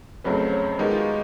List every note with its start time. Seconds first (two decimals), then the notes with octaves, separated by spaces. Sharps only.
0.24 F2 C#3 F#3 A3 B4
0.38 C5
0.52 C#5
0.79 D#3 G#3 B3 D#4 G4
0.91 F4
0.97 F#4